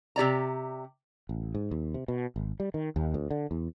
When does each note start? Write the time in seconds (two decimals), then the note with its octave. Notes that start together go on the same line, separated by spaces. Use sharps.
0.16 C3 G4 D5 A#5
1.29 A1
1.55 G#2
1.71 D#2
1.94 C3
2.08 B2
2.36 G#1
2.60 G3
2.74 D#3
2.96 D#2
3.14 D2
3.31 D3
3.51 E2